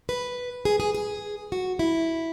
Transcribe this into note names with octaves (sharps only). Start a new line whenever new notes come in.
B4
G#4
G#4
G#4
F#4
E4